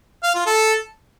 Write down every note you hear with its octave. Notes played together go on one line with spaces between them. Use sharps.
F5
F4
A4